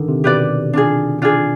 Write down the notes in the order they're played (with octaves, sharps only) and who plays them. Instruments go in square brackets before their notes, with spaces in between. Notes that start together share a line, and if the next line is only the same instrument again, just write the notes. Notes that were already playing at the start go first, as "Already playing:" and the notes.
Already playing: [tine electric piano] D3 D#3
C3
[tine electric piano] B2 [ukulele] G4 B4 D5
[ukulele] D4 F4 G#4
D4 F4 G#4